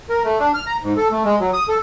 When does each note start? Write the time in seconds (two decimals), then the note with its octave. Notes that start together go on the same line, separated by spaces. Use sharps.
0.09 A#4
0.25 A3
0.40 D4
0.54 F6
0.66 A#5
0.83 G#2
0.97 A4
1.11 A3
1.25 G#3
1.40 F#3
1.53 D#6
1.69 A4